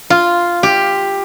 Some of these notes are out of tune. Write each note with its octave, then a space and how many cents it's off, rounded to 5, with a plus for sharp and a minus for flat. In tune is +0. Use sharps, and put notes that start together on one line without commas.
F4 -5
G4 +10